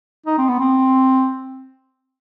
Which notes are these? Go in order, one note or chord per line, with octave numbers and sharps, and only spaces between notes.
D#4
C4
B3
C4